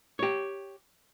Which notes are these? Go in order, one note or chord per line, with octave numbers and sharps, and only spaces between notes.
G4 C#5